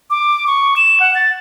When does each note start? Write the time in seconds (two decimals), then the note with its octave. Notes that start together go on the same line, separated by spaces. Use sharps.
0.10 D6
0.47 C#6
0.77 E7
1.00 F#5
1.15 A6